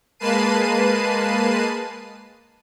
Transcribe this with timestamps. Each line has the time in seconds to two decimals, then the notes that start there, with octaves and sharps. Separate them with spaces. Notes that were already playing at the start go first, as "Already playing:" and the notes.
0.19 G#3 A#3 B4 A5 C7 D#7